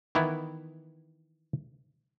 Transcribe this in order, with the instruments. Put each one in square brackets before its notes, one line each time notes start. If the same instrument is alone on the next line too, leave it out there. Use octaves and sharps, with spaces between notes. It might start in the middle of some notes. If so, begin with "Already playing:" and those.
[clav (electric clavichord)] D#3 E3 B3 E4